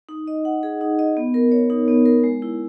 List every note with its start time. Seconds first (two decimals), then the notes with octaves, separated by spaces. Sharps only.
0.09 D#4
0.28 D#5
0.45 F#5
0.63 G#4
0.81 D#4
0.99 D#5
1.17 B3
1.34 A#4
1.52 C#5
1.70 D#4
1.88 B3
2.06 A#4
2.24 G#3
2.42 E4